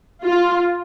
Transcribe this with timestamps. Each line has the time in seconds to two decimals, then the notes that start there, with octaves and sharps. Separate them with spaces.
0.24 F4